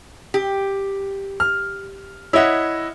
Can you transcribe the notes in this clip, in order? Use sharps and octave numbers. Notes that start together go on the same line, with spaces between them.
G4
F6
E4 C#5 D#5 E5 F#5